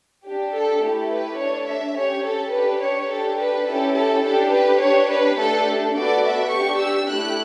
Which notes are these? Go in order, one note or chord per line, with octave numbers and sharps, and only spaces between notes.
D4 G4
A4
A3 E4 G4
B4
D4 A4 C#5
E5
C#4 G4 C#5
A4
D4 G4 B4
C#5
D4 G4 A4
B4
C#4 E4 G4 A4
A4
D4 G4 A4
B4
D4 G4 C#5
B4
A3 D4 G4 A4
B3 F#4 A4 D5
E5
D4 G4 C#6
E6
A3 E4 G4 F#6